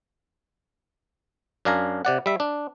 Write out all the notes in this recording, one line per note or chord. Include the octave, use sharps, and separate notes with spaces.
F#2 D4 F5 G#5 A#5
C3 D5 F#5
G3 E5
D4